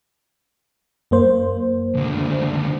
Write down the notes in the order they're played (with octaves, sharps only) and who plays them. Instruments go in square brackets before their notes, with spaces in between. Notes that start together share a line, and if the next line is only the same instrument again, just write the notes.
[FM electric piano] F#2 A#3 C5
[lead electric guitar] C#2 D3